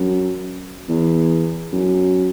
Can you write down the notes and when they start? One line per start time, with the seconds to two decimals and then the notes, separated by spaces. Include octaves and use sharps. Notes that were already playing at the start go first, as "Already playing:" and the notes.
Already playing: F#2
0.89 E2
1.73 F#2